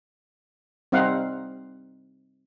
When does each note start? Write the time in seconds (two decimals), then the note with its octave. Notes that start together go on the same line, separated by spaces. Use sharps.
0.92 G3 C4 D#4 F5 F#5